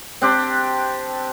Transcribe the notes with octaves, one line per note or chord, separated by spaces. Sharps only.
C4 D4 G4